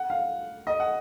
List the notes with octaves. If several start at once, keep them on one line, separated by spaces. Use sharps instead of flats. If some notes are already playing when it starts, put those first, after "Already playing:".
Already playing: F#5
F5
D#5
F#5